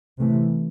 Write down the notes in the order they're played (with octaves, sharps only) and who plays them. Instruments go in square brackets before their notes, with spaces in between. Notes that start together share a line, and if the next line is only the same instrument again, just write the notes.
[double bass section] C3 E3 A3